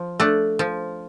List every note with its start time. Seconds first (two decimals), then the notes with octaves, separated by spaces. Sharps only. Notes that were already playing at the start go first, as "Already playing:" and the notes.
Already playing: F3
0.20 A3 D4
0.59 F3